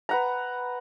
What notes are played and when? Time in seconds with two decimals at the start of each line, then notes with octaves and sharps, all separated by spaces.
0.09 B4 F#5 A#5